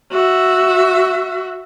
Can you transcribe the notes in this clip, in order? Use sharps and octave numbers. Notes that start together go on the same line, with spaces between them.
F#4 E5